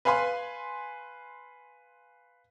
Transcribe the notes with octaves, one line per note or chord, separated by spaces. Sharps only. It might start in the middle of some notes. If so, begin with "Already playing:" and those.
B4 F5 G#5 B5 C6